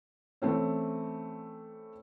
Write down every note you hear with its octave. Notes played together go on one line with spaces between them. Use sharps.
E3 A3 C4 C#4